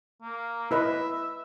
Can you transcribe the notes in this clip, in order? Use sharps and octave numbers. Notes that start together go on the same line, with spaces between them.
A#3
E4 B4 D#5 E5